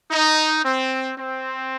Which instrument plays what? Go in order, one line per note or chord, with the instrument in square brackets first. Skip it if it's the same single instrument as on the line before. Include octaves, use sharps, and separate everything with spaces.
[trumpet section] D#4
C4
C4